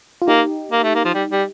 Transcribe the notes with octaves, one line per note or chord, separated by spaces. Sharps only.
F4
A#3 D#4 G4
A#3
A3
A#3
F3
G3
G3